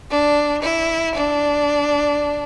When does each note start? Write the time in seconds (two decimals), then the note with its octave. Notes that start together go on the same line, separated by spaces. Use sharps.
0.10 D4
0.62 E4
1.14 D4